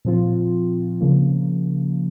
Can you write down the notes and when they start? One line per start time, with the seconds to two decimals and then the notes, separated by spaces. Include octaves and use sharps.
0.05 A#2 F3 C4 F4
1.01 C#3 F3 A#3